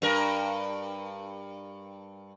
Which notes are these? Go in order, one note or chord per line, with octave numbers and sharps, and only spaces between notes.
G2 A#4